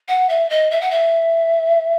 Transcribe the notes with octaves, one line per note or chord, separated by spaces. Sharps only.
F#5
E5
D#5
E5
F#5
E5